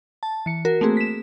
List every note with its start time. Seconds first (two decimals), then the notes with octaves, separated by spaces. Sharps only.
0.23 A5
0.46 E3 C#7
0.65 F#4 A#4
0.81 A3 A#3 C4 G#4
0.97 B6 E7